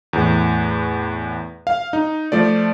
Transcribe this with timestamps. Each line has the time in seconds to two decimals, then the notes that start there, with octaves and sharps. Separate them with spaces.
0.13 E2 A2
1.67 F5
1.93 D#4
2.32 F3 A3 D5